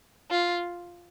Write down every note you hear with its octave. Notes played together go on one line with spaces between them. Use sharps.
F4